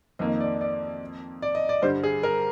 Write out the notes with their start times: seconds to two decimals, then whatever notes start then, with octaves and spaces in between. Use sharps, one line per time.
0.19 F2 D#3 A#3 D#5
0.40 D5
0.61 D5
1.42 D5
1.55 D#5
1.69 D5
1.82 G2 D3 G3 C5
2.03 G#4
2.23 A#4